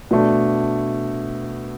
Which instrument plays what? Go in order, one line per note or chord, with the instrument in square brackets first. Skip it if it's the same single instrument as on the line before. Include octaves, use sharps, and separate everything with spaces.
[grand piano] B2 A3 D4